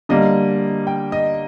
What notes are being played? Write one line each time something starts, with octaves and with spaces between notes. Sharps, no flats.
D3 G3 A#3 D#5
G5
D#5